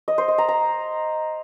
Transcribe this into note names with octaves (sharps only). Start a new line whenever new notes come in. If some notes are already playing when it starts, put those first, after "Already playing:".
D#5
C5
D#5
A#5
A#5